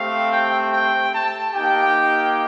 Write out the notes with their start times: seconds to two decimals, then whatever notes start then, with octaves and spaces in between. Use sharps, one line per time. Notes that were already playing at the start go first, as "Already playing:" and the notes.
Already playing: A3 C4 G4 F5
0.30 G5
0.71 G5
1.12 A5
1.52 A#3 D#4 G4 G5